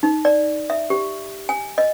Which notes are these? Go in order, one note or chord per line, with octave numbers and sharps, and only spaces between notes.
D#4
D5
E5
G4
G#5
D#5